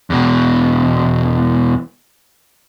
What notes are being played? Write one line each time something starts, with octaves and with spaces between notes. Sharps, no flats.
E2 B2